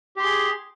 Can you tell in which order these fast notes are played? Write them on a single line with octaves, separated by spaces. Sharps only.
G4 C6 G#4